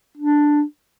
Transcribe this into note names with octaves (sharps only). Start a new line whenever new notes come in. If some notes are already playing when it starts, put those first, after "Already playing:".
D4